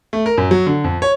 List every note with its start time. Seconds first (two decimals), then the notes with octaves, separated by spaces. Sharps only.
0.13 A3
0.26 A#4
0.38 F#2
0.51 F#3
0.67 D3
0.84 F2
1.02 C#5